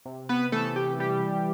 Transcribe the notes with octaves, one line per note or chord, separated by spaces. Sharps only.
C3
B3 B4
E3 A3 A4
G4
G3 G4